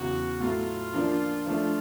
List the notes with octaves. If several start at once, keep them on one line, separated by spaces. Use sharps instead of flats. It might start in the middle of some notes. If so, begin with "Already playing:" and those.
Already playing: E2 C#3 F#3 F#4
A2 F#3 A3 F4
F3 A#3 D4
F3 A3 D4 F4